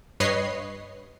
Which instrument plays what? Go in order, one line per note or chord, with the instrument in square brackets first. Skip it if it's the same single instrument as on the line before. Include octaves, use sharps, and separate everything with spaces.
[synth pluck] G2 B4 C#5 D#5 C7